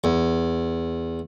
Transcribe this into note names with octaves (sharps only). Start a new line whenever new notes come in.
E2